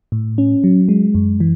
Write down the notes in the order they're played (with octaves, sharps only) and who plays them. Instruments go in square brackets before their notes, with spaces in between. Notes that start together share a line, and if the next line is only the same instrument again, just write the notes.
[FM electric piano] A2
C#4
F#3
G#3
F#2
E3